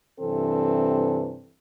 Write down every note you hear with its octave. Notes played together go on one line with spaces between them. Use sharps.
G2 C3 E3 C4 A4